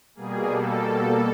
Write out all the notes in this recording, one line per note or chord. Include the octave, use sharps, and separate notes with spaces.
B2 G3 A#3 G#4
A4